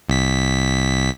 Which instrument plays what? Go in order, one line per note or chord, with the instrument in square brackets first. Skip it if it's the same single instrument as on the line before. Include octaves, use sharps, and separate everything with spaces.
[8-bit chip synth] C2 B6